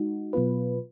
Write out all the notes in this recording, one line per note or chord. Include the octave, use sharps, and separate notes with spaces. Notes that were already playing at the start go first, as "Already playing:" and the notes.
Already playing: G#3 D#4 F#4
B2 F#3 B3 F4 B4